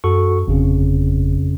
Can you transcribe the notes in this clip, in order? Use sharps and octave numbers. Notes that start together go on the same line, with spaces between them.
F#2 F#4 A4 C#6
G1 F2 C#3